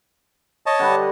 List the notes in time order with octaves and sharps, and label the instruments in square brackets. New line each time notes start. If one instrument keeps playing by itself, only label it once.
[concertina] C#5 D#5 A5
[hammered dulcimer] D3 G3 B4
C6